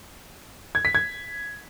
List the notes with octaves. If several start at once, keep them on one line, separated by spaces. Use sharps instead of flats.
G#6
B6
G#6